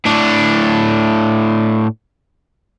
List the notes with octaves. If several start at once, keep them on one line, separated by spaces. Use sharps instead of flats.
A2 D4